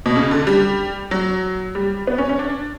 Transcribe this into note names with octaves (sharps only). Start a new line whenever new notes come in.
B2
C#3
D3
G3
F#3
G3
B3
C#4
C#4
D4